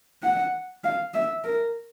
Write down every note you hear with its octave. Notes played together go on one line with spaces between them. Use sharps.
F#5
F5
E5
A#4